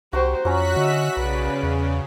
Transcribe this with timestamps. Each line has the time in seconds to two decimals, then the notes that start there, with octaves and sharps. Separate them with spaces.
0.13 C2 F#4 G4 C5 A#5 C#6
0.45 F2 F#3 C#4 F4 F#4 A#5 F#6 B6
0.76 D3 D#5 E5
1.17 B1 C#3 B4 D5
1.63 E2